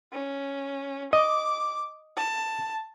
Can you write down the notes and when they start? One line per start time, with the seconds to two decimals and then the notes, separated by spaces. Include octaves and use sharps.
0.13 C#4
1.13 D#5 D6
2.17 A5